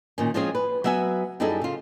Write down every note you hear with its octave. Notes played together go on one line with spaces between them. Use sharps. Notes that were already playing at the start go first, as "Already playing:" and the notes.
A#2 D#3 C#4
F3 G#3 C4 C#4 F4 G#4
B4
F#3 B3 E5 F#5 G#5
F#2 G3 D#4 E4 G#4 A4
C#3 F4